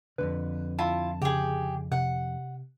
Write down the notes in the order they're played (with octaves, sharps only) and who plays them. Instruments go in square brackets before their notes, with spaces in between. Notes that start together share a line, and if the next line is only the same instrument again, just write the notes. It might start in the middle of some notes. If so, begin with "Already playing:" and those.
[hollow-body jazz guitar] F2 G#2 D3 [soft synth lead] B4
[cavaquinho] E4 F4 [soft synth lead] A5
[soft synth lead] C#3 [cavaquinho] G4 G#4
[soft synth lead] C3 [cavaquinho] F#5